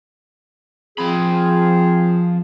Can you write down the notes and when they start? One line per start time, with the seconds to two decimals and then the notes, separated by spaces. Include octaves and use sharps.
0.98 F3 C4 G#4 B5